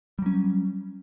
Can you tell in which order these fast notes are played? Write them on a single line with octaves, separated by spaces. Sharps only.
G3 F#3 C#4